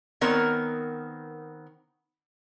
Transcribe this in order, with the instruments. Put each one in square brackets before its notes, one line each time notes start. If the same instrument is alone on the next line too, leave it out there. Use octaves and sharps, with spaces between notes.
[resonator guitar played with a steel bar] D#3 B3 C4 A#4 C#5